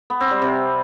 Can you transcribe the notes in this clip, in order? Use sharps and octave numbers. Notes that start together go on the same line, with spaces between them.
B3
C4
G3
C3